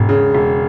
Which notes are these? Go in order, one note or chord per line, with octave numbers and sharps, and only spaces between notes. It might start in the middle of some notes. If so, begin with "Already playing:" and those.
Already playing: E1 G#2 B2
C#3
E1